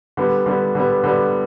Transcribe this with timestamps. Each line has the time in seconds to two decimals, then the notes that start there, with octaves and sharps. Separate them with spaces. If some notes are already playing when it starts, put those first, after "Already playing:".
0.17 D3 G3 B3
0.46 D3 G3 B3
0.75 D3 G3 B3
1.04 D3 G3 B3